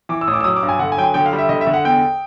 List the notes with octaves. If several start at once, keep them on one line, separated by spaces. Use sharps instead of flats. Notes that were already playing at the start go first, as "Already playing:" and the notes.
E3 D6
E6
A1 D#6
D6
E6
F#3 D#6
D6
G2
G#5
D3 F#5
G#5
F#3 G5
G#5
D3 G5
F5
G3
E5
D3 D#5
E5
D3
F#5
E2 G5